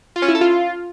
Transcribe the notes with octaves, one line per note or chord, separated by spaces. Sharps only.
F4
C#4
E4
A4
F4